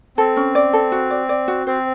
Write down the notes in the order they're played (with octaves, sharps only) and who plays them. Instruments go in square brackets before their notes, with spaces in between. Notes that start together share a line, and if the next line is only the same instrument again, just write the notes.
[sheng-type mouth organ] C4 [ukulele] A4
[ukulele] C#4
D5
A4
F#4
D5
D5
F#4
[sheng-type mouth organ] C4 [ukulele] C5